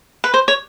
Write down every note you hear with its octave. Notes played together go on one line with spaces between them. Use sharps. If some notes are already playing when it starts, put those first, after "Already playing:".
B4
C5
C#5